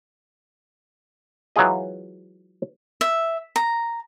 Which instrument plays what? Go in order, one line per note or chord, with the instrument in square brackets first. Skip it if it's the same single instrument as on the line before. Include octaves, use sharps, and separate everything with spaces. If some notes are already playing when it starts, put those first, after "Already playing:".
[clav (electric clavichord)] E3 F#3 G#3 F4 G#4 D#5
[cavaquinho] E5
A#5